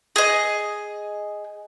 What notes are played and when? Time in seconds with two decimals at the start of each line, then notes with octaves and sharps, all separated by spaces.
0.16 G#4 D#5